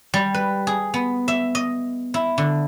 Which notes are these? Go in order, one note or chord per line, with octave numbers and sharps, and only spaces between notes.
G3
B4
G#4
B3
E5
D#5
E4
D3